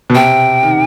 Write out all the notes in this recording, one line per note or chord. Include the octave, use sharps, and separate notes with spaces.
B2
C3 G5
D#3